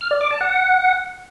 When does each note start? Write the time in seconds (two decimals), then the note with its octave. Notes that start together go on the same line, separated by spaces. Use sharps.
0.01 F6
0.11 D5
0.21 D6
0.31 A5
0.41 F#5